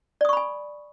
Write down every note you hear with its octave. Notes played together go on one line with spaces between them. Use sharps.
D5 G#5 B5 C#6 D#6